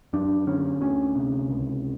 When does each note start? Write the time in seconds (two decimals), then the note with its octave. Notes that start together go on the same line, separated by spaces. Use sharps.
0.13 F#2 D4
0.47 D3 C#4
0.81 D2 C#4
1.16 C3
1.50 C#2